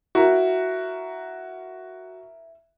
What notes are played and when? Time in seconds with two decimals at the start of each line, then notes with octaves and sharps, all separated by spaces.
0.15 E4 F#4 A#4